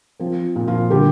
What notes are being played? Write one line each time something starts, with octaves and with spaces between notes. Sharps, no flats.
F3 C4
A#2
F3 F4
D3 G3 G4